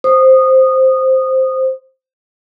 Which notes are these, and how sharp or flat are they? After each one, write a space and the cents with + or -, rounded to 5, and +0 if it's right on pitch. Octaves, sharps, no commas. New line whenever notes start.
C5 +0 D#6 -15